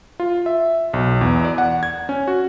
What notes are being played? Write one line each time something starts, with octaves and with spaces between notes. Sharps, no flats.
F4
E5
B1
E2
D5
F#5
G#6
C#4
F#4